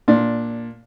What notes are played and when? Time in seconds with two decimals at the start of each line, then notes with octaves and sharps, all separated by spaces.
0.08 A#2 D4